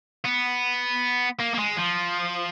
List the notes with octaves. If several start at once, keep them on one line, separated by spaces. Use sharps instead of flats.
B3
A#3
A#3
G#3
F3